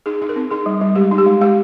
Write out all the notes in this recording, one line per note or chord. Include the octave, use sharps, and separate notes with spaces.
D#4 G#4
D#4
A#4
C4
D#4 G#4
G3
G3
G#3 G4
D#4
G4
G#3
G#3 G4